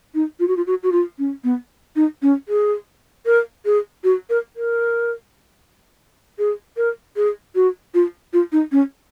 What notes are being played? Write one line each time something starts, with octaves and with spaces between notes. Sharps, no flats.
D#4
F4
F#4
F4
F#4
F#4
F4
C#4
B3
D#4
C#4
G#4
A#4
G#4
F#4
A#4
A#4
G#4
A#4
G#4
F#4
F4
F4
D#4
C#4